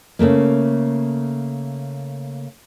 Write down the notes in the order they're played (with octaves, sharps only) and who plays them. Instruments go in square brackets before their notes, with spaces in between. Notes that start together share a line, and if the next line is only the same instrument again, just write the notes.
[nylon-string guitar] C#3 F3 A3 A#3